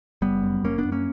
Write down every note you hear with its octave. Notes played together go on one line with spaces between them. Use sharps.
F#1 G3 B3
F#2
F#1 A#3 C#4
B3 D4
F#2
A#3 C#4